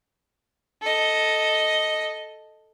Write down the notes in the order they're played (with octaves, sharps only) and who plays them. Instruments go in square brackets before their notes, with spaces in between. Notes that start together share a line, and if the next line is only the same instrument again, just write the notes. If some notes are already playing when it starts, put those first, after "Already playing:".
[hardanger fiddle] A4 D#5